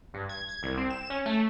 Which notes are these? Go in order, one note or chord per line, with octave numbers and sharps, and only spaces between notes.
G2
G#6
G#6
C2
C4
E7
C#4
A3